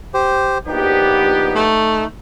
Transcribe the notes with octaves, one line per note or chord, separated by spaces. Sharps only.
G4 C5
A#1 B3 D#4 G4
A3